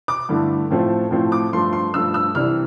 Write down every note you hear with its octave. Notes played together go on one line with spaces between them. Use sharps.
D6
G2 D3 A3 E4
A2 F3 A3 C4
A2 F3 A3 C4
D6
G2 F3 A3 C6
C6
G2 F3 A3 E6
E6
C2 C3 E3 G3 D4 F6